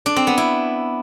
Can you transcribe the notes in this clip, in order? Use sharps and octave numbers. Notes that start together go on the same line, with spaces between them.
D4
C4
B3
E4